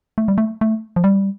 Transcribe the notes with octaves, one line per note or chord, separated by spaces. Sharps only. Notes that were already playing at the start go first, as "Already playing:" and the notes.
A3
G3
A3
A3
F3
G3